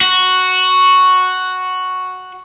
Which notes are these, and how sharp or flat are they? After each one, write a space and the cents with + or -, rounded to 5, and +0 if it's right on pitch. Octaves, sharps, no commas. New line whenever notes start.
F#4 +0